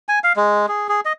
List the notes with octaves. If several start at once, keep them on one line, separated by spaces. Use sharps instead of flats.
G#5
F5
G#3
G#4
G#4
D#5